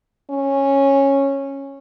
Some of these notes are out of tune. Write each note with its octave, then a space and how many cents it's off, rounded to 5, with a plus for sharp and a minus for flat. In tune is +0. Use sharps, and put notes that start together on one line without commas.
C#4 -10